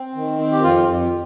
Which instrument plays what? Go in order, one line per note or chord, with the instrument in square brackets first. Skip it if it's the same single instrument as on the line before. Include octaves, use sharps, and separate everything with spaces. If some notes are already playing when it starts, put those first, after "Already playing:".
Already playing: [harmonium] C4
D#3
C4
G4
F2 F4
F2